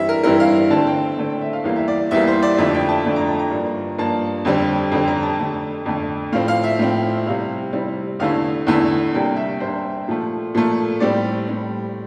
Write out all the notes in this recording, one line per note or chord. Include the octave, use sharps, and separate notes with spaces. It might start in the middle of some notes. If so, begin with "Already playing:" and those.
Already playing: G2 E3 G3 C4 E4 E5
A#4
G2 E3 G3 C4 E4 A#4
F5
D3 A3 C4 A5
G5
D3 A3 C4
G5
E5
F5
E2 E3 G3 A#3 F5
E5
D5
E2 E3 G3 A#3 E5
C5
D5
F2 D3 F3 A3 D4 E5
G5
A5
F2 D3 F3 A3 D4
A#5
A5
A#5
G2 F3 A#3
G2 F3 A#3 A5
F2 D3 G3 C4
F2 D3 G3 C4 G5
A#5
A5
F2 D3 A3
F2 D3 A3
A2 F3 C4 F5
F5
E5
A2 F3 C4
C3 G3 C4 E4 F5
C3 G3 C4 E4
E2 D3 A3 E4 F5
E2 D3 A3 E4
C3 G3 A#3 D4 G5
E5
C3 G3 A#3 D4 C5
A#2 F3 A3
A#2 F3 A3
A2 G3 C4 D5
A2 G3 C4